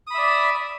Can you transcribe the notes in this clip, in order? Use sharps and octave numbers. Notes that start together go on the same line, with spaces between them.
D5 E5 B5 D#6